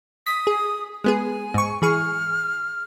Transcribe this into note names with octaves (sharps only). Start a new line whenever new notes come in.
D#6 B6
G#4
G#3 B3 G#4 G#5
G#2 C#6
E3 G#4 C#6 F6